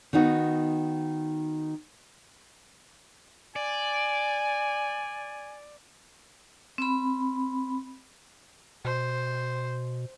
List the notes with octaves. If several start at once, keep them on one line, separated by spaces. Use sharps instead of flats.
D#3 B3 D#4 F#4
D5 G#5
C4 B5
B2 C5